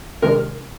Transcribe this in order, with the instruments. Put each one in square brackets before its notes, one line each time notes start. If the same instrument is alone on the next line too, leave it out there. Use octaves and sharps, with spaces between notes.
[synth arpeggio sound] C3 D#3 G#3 D4 [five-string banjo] A#4